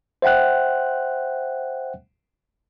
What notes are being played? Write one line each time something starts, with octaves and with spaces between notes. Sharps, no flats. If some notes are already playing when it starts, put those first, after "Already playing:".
C5 E5 F#5 G5 F#6